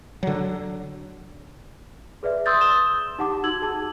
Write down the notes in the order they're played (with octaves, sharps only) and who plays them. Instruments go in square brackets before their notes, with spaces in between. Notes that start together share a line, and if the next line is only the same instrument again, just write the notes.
[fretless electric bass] D3 F#3
[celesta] G#4 B4 D5 E5
C6 D#6 E6 G6 A6
C6 D#6 E7 G7
D#4 G4 F#5 A5 D6
D#4 F#4 E6 G#6 F#7
G#4 A5